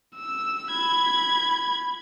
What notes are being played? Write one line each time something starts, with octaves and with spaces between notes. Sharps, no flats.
E6
B5 G#6